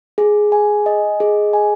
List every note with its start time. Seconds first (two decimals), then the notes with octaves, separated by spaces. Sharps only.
0.18 G#4
0.52 G#5
0.86 D#5
1.20 G#4
1.53 G#5